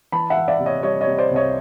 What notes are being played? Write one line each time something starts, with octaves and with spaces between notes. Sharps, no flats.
E3 A5 B5
E5 F#5
E3
D5 E5
C3
C#5 D#5
G3 C#5 D#5
C#5 D#5
C3
C5 D5
C2
C#5 D#5